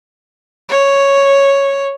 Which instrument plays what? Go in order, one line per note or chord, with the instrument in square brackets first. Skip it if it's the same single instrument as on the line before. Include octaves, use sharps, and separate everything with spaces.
[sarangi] C#5